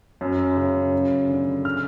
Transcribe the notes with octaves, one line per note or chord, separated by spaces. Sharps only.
F#2
C#3
F#2
D3
F6